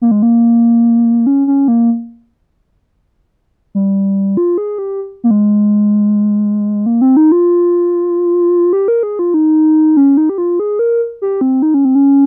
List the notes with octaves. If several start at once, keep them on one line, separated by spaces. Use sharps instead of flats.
A#3
G#3
A#3
C#4
C#4
A#3
G3
F4
G#4
G4
A#3
G#3
A#3
C4
D#4
F4
G4
A#4
G#4
F4
D#4
C#4
D#4
G4
F4
G#4
A#4
G4
C4
D#4
C#4
C4
C#4